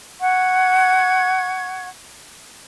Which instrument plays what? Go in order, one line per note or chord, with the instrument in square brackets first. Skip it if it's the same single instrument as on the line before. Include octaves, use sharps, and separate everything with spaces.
[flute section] F#5 C#6 G#6